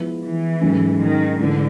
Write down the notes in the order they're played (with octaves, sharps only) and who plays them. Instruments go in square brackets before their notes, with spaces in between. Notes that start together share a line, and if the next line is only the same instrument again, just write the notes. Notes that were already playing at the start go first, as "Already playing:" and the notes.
Already playing: [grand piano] F3 G#3 B3 E4
[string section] E3
[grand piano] G#2 D#3 F#3 A3 C#4
[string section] D#3
[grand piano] G#2 E3 A3 [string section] D3